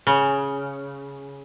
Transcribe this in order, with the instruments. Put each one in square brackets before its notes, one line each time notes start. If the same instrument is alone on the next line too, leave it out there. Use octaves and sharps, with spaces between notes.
[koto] C#3